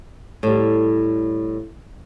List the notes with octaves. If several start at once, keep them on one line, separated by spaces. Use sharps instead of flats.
A2 G3